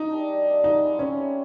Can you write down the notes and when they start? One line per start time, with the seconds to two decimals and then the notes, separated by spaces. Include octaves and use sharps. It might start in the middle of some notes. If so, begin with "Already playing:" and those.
Already playing: D#4
0.11 D4 G4 A#4
0.28 G3
0.46 A#3 D4 G4
0.64 F3 D#4
0.81 G#3 C4 E4
0.99 C4 C#4
1.17 E4 G4 C5